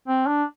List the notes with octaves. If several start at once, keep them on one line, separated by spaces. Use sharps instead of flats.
C4
D4